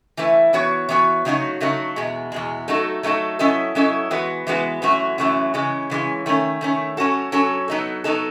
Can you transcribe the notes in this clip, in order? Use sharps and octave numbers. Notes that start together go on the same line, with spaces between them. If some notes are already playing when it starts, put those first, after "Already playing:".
E3 A3 E4 B4
E3 B3 F#4 C#5
E3 B3 F#4 C#5
C#3 F#3 A3 D#4 F#4
C#3 F#3 A3 D#4 F#4
E2 B2 G#3
E2 B2 G#3
F#3 A3 D#4 F#4 A4
F#3 A3 D#4 F#4 A4
F#3 C#4 E4 A4 D#5
F#3 C#4 E4 A4 D#5
E3 G#3 B3 F#4 B4
E3 G#3 B3 F#4 B4
F#2 E3 A3 C#4 F#4
F#2 E3 A3 C#4 F#4
C#3 E3 G#3 C#4
C#3 E3 G#3 C#4
D#3 A3 C#4
D#3 A3 C#4
F#3 C#4 F#4 A4
F#3 C#4 F#4 A4
F#3 B3 D#4 A4
F#3 B3 D#4 A4